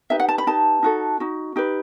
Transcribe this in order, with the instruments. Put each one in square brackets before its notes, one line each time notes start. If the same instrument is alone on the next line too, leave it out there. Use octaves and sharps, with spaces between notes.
[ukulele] D#4 G4 B4 E5
F#5
A5
B5
D#4 G4 B4 A5
D#4 F#4 A4
D#4 F#4
D#4 G4 B4